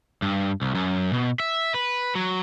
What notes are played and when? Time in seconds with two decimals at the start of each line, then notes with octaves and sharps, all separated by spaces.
0.22 G2
0.62 C2
0.75 F#2
1.13 B2
1.40 E5
1.74 B4
2.15 F#3